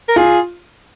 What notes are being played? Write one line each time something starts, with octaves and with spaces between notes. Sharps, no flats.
A#4
F4 G#4